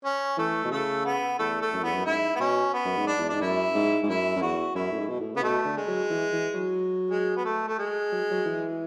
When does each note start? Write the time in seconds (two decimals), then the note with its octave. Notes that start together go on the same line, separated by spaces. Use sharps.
0.05 C#4
0.38 E3 A3
0.65 B2
0.72 C#3 A3
1.05 B3
1.39 E2 A3
1.62 A3
1.73 F#2
1.83 E2 B3
1.93 F#2
2.06 G#2 E4
2.36 B3
2.40 B2 C#4
2.73 B3
2.85 F#2
2.97 G#2
3.07 D4
3.19 E2
3.29 G#2 D4
3.41 F#2 E4
3.75 G#2
4.03 G#2
4.08 F#2 E4
4.36 F#2
4.42 E2 F#4
4.75 F#2 E4
4.92 A2
4.98 G#2
5.09 B2
5.21 A2
5.35 C#3 B3
5.42 B2 A3
5.65 D3
5.77 G#3
5.88 F#3
6.10 E3
6.33 E3
6.54 F#3
7.10 G#3
7.37 B3
7.45 A3
7.68 A3
7.79 G#3
8.12 F#3
8.31 F#3
8.46 E3